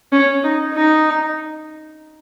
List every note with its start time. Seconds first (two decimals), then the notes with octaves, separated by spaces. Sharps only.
0.12 C#4
0.44 D#4
0.74 D#4